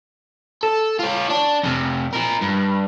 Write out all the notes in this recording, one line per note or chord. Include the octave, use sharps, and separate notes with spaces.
A4
F4 C#5
D4
F2 C3
F3 A#4
G2